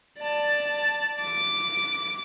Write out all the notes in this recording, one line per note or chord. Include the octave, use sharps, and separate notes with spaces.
D5 A5
D6